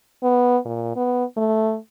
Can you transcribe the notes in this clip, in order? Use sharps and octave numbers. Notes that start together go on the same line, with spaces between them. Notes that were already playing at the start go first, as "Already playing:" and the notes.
B3
A#2
B3
A3